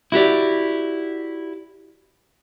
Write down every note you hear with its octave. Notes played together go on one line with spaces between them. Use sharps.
E4 F#4 G4 D5